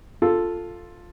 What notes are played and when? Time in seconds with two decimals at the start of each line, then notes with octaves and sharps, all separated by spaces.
0.22 F4 A4